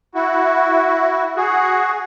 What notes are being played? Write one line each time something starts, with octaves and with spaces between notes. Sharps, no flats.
E4 F#4
F#4 G#4